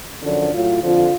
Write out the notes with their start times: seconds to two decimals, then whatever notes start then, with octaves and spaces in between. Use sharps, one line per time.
0.22 F#2 D3 F3 D4
0.52 A2 F#3 F4
0.81 F2 D3 F3 F4